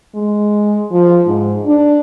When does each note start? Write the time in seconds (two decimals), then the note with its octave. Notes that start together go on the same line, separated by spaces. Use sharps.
0.15 G#3
0.92 F3
1.26 G#2
1.65 D4